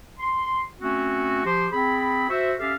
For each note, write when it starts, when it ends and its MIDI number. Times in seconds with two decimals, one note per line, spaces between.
0.18 0.62 84
0.80 1.40 57
0.80 1.40 60
0.80 1.40 61
0.80 1.40 66
1.44 1.66 53
1.44 1.66 67
1.44 1.66 72
1.71 2.26 60
1.71 2.26 68
1.71 2.26 83
2.28 2.52 66
2.28 2.52 72
2.28 2.52 76
2.58 2.73 61
2.58 2.73 67
2.58 2.73 69
2.58 2.73 76
2.58 2.73 77